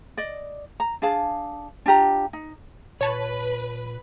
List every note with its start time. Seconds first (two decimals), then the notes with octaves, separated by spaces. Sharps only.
0.17 D5 D#5
0.80 A#5
1.02 D4 G#4 F5 A5
1.86 D4 F4 G4 A#5
2.33 D#4
3.01 A#2 B4 C#5 A5